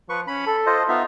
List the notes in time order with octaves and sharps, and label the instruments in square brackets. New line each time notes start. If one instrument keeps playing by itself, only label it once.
[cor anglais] F3 [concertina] B4 C#6
[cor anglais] C#4 [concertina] B5
[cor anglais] A4
[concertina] F4 C5 D#5
[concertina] B3 D#4 E5 [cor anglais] F4